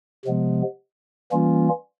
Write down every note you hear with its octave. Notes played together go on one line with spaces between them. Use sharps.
C3 F3 G#3 B3
E3 G3 A#3 C#4 F4